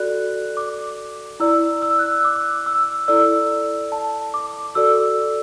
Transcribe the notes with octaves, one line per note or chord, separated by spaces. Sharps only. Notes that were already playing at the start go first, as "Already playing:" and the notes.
Already playing: F#4 A4 D5 F#6
D6
E4 D5 E6
E6
F#6
E6
D6
E6
E4 A4 D5 E6
A5
D6
F#4 A4 D5 E6